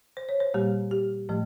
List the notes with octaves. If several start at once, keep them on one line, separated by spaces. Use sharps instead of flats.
C5
C#5
C5
A#2 G3 A#3 G4
G4
A2 F3 A3